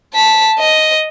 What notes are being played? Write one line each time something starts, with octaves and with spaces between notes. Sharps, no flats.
A5 B6
D#5